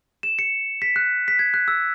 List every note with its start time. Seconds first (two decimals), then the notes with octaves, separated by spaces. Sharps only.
0.23 E7
0.39 C#7
0.82 B6
0.96 F#6
1.28 B6
1.39 G#6
1.54 F#6
1.68 E6